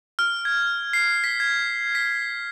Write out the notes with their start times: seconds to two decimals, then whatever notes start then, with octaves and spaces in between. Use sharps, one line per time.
0.19 F6
0.45 G#6
0.93 C7
1.24 B6
1.40 G#6
1.95 B6